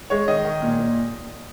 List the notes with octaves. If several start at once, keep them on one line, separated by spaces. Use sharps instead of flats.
G#3 C#5
D#3 D#5
D#3
A#2
A#2